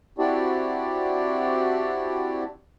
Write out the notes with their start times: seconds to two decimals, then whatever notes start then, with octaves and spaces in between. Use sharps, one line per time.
0.18 C4 D4 E4 F#4 G4 D5